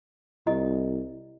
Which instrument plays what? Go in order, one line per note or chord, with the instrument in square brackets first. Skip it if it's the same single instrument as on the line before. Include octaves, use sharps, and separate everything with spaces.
[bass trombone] C2 [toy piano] E4 D#5